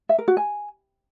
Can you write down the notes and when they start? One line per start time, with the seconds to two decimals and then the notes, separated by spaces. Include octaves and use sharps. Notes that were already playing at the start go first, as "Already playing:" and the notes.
0.09 E5
0.19 A#4
0.28 F#4
0.37 G#5